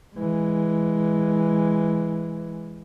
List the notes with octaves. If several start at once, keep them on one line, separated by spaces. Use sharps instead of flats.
E3 G#3